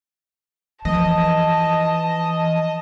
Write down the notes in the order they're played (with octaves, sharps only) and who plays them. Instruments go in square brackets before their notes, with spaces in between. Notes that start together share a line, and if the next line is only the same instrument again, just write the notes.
[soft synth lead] E3 [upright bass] F3 [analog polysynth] D#5 [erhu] A5